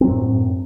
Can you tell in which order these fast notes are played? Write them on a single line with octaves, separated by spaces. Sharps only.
C4 F#3 F#2 A2